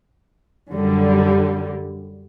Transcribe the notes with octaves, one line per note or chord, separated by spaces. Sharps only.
F#2 D3 G3